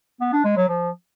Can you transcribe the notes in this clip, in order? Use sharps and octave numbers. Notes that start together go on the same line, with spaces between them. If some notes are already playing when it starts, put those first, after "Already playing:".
B3
D4
G#3
F#3
F3